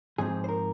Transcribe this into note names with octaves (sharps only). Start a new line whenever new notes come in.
G#2 F3 C4 G#4
C5
A#4